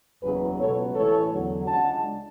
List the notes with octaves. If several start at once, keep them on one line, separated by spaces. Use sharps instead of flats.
F#1 E2 C#3 F#3 G#4 B4
C#2 B2 F#3 B3 A4 C#5
A1 A2 E3 A4 C#5
E2 D3 F#3
C#2 C#3 G#3 D4 F#5 A5